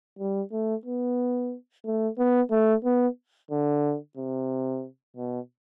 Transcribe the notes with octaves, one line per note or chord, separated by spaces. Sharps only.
G3
A3
B3
A3
B3
A3
B3
D3
C3
B2